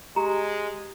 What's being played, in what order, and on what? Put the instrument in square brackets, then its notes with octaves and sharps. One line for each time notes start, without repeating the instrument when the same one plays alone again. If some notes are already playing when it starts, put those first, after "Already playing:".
[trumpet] G#3 [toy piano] G4 A#5